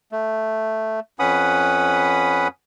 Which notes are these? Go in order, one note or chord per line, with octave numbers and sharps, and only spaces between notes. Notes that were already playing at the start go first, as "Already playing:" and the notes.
A3
F2 C#4 B4 F#5 B5 D#6